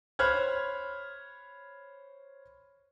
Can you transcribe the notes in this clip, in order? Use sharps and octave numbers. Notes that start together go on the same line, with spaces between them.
C5 C#5 B5 F6 F#6 G#6